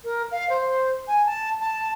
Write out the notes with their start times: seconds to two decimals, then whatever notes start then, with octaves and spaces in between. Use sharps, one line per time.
0.04 A#4
0.31 F5
0.50 C5
1.08 G#5
1.26 A5
1.61 A5